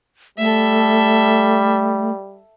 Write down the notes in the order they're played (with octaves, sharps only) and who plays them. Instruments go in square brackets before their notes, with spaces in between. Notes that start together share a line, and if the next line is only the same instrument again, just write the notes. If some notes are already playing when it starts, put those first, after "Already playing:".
[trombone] G3 [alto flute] A3 [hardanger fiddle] A4 E5